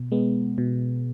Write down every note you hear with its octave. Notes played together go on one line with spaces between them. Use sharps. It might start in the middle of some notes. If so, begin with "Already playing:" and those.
Already playing: B2
G#3 B3
B2